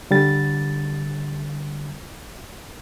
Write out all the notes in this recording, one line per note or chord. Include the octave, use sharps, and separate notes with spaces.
D3 G3 A6